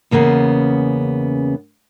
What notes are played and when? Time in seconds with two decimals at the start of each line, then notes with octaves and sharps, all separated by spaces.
0.11 E2 C#3 A#3 B3 C#4